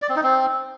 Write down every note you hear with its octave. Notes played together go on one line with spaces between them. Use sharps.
D5
C4
D#4
C4